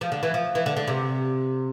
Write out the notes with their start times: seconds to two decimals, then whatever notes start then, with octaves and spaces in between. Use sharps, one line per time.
0.01 F3
0.12 D3
0.23 E3
0.34 F3
0.55 E3
0.66 D3
0.76 D3
0.88 C3